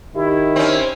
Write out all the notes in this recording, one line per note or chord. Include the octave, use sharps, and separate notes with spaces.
D#3 E4 G4
C4 C#4